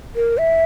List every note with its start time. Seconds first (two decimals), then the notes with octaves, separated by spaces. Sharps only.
0.16 A#4
0.38 E5